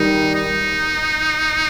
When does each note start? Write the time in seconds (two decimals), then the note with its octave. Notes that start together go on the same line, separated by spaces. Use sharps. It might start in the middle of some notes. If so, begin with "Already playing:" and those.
Already playing: D#3 G3 D#4
0.35 D#4